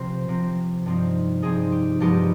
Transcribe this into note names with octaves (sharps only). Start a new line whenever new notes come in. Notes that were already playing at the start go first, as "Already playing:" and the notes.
Already playing: C3 F3 C4 C5
C3 F3 C4
G2 F3 C4 D#4
G2 F3 C4 D#4 G#4
G4
G2 F3 G#3 B3 D#4 G4